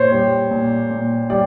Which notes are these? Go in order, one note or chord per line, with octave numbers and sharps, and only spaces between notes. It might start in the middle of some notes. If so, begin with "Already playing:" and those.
Already playing: A#2 C5 C#5
G3
A#2
A#2
G3 D5